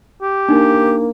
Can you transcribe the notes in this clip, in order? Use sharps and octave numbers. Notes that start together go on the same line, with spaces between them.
G4
A#3 D4 D#4